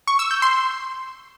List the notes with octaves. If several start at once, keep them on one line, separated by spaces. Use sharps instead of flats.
C#6
E6
G6
C6